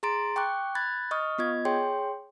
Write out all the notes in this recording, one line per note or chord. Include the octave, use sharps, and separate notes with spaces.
G#4 A#5 C6 A6 D7
G5 C#6 D6 F#6
B5 F#6 G#6 A6
D#5 C#6 D#6 F6
B3 F4 D#5 G#6
G#4 C#5 G5 C6